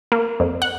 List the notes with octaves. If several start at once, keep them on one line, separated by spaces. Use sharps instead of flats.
A#3
F2
F#5